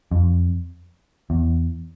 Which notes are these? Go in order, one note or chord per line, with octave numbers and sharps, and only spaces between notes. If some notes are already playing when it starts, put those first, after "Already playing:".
F2
E2